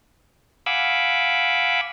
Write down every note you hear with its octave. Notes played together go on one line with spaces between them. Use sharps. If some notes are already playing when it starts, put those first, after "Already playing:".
F5 F#5 G#5 B5 D6 E6